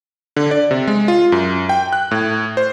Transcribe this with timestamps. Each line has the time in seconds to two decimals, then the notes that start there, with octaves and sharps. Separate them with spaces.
0.36 D3
0.51 D5
0.71 C3
0.87 G#3
1.08 F4
1.32 F#2
1.69 G5
1.93 F#6
2.11 A2
2.57 C5